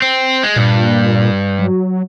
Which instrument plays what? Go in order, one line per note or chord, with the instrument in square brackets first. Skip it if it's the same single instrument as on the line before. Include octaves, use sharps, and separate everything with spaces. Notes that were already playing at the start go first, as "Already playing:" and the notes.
[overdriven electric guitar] C4
G#3
[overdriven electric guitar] G2 [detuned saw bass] A#2
[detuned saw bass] F#3